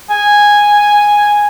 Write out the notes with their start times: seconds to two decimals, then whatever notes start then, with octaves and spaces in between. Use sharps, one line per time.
0.10 G#5